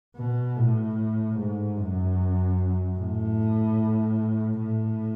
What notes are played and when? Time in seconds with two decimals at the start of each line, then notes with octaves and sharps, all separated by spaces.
0.16 B2
0.56 A2
1.37 G#2
1.77 F#2
2.97 A2
4.58 A2